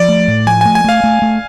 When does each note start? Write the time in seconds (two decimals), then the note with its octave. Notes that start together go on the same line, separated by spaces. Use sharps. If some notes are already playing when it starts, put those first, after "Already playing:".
Already playing: F3 D5
0.09 A3
0.28 A2
0.46 F3 G#5
0.61 A3 G#5
0.75 G#5
0.84 A3 F5
1.04 A3
1.22 A3